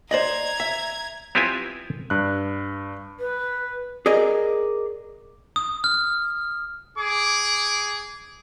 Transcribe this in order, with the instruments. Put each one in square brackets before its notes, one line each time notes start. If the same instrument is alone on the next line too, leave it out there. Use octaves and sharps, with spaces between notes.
[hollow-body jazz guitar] C5 D5 D#5 [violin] A#5 G#6
[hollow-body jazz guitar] E5
[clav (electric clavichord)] B3 C4 E4 F4 G4 G#5
[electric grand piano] G2 F#6
[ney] B4
[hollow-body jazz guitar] G#4 A#4 D5 D#5
[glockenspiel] D#6
F6
[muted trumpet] G#4 [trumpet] D6